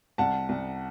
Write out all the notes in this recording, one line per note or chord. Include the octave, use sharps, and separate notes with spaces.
C2 F#5 A5
C2